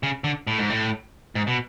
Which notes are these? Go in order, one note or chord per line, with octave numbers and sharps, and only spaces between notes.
C#3
D3
A2
G#2
A2
G#2
B2